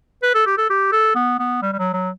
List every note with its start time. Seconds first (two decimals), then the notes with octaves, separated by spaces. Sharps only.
0.23 B4
0.35 A4
0.46 G4
0.58 A4
0.70 G4
0.92 A4
1.15 B3
1.39 B3
1.62 G3
1.73 G3
1.79 F#3
1.94 F#3